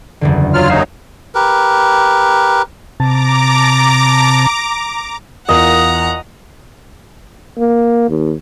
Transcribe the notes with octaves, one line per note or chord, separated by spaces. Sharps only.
F#1 E2 D3
F#3 F4 F6
D#2 F#3 D#4 E5 F5 G#5
G4 A#4 B4
C3 A5 A#5 D6
E2 F4 A#4 D#5 F5 F#5 A#5
A#3
D#2